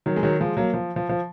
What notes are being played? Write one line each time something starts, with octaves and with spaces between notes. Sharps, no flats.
D#3 F#3
G#3
D#3 F#3
F3 G#3
F#3 A#3
F3
F3
F3